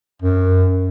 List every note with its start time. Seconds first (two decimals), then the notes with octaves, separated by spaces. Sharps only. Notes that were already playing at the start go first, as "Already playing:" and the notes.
0.22 F#2